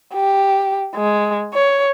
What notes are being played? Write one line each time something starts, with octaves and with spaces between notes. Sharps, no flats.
G4
G#3
C#5